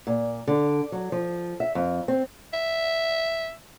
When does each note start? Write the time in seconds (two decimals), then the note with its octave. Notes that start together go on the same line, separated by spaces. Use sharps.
0.07 A#2
0.48 D3
0.92 F#3
1.12 F3
1.60 E5
1.75 F2
2.08 C4
2.53 E5